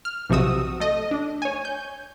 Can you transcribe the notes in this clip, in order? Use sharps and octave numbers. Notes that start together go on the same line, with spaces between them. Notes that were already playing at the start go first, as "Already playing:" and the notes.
F6
B1 C3 F3 F#4 D#6 E6
A3 D#5
D4
C#5 G#5
G6